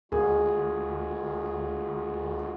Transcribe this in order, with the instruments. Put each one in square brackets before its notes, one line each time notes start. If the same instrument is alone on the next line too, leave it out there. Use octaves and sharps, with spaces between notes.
[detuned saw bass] D2 [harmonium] G#3 F4 F#4 [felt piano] G#4